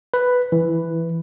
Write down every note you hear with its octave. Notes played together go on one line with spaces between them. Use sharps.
B4
E3